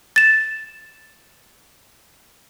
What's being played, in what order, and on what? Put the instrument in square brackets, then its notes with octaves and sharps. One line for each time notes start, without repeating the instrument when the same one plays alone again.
[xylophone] A6 E7